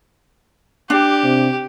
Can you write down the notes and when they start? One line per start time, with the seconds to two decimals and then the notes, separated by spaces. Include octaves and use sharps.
0.90 D4 G4
1.23 C3